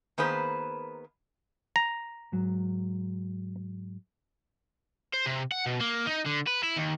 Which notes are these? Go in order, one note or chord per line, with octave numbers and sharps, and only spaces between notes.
D#3 A#3 B3 G#4 B4 C5
A#5
G#2 F#3
C5
C3
F#5
B2
A#3
D#4
D3
B4
E4
D#2